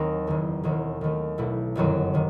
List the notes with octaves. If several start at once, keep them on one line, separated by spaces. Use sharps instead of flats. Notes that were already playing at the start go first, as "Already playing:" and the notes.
Already playing: D#2 D#3 F#3 C4 D#4
F#1 E2 D#3
E1 D#2 D#3 F#3
D#2 D#3 A3
B1 B2 A3 E4
G1 F#2 D#3 F#3 C4
C3 D#3